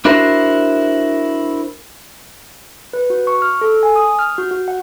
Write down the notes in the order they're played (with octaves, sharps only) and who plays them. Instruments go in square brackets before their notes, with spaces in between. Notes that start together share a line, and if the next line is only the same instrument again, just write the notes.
[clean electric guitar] D4 E4 F#4 A#4 C5
[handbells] B4
F#4
C#6
F6
A4
G#5
D#6
F6
F#4
F#4
F#5